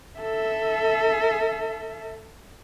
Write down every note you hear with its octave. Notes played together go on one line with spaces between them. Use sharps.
A4 E5